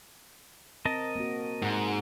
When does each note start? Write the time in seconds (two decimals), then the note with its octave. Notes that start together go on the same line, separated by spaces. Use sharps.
0.85 C4 A#4 D#5 A5
1.15 A#3 C4 F#4
1.62 G#2 F#5